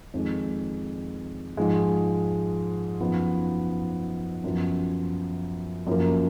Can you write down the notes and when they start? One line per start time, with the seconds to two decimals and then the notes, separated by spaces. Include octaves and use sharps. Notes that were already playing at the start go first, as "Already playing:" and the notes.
0.14 F2 D#3 G#3
1.57 G#2 F3 G#3
3.00 F#2 F3 B3 D#4
4.44 F#2 F3 B3 F4
5.87 F#2 F3 A#3